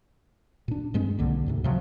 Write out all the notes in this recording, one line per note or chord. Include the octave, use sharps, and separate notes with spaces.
A#2 D4
G2 G#3 C4
B1 D3 A#3
D2 G#2 C3
C3 F3 F#3